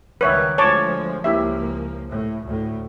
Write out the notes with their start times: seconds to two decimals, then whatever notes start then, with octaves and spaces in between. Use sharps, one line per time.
0.21 C#2 D#3 G3 B4 C#5 E5
0.58 D2 F3 G#3 C#5 A5 D6
1.24 C#2 F3 A#3 E4 G4 E5
2.10 A2
2.46 D2 A2